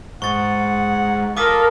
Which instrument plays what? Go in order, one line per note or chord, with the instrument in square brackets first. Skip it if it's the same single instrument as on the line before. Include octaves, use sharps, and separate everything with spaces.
[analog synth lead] G#2 [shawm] F#5 [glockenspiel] C#6 A6
[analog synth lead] F4 [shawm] A4 [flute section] A#4 [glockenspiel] D6 D#6 B6